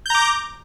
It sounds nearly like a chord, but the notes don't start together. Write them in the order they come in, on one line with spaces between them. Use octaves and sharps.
G6 A#5 D6